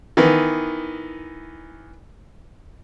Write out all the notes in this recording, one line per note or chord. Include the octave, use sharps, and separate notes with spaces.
D#3 E3 B3